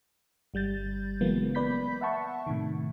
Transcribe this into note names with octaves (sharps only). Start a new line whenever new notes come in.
G1 G3 G6 A6
C#3 E3 F#3 G#3 A#3 B3
B3 B4 D5 B5 G6 B6
E5 F#5 A5 C#6
A2 C3 D#3